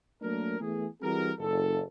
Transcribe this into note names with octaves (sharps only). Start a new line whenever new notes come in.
F#3 A3 A#3 D4 A#4
E3 A3 B3 G#4
E3 G3 C4 F#4 G#4 A#4
F#1 A4